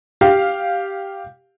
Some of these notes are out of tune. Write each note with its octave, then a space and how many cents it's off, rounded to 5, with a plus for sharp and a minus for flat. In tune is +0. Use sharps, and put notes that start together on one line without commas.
G4 +0 F5 +0